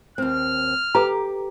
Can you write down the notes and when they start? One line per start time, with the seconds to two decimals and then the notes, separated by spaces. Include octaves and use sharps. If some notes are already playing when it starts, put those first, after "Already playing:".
0.18 D#2 C4 F6
0.95 G4 A4 B4 A#5